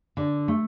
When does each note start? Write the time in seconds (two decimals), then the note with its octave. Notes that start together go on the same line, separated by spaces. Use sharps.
0.17 D3
0.48 A3